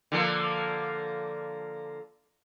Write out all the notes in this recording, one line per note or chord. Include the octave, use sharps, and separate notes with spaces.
D3 F3 A#3